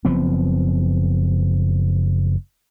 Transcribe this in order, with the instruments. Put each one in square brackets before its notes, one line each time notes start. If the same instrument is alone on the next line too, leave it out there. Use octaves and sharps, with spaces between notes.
[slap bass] F#1 F3 B3 C4